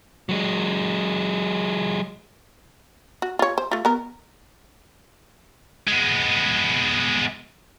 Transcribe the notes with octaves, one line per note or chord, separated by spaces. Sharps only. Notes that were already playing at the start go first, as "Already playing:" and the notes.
F#3 G#3
F#4
F4 C#5
C5
A3 F4
B3 A#4
G#3 B3